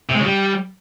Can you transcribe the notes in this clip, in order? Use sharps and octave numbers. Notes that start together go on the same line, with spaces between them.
C3
G#3
C#3
G3